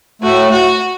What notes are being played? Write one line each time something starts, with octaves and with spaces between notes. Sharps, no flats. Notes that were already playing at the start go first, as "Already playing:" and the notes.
A2 A3 F#4
F#4